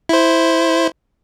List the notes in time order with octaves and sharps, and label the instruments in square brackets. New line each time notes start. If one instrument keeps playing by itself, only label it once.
[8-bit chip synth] E4 C5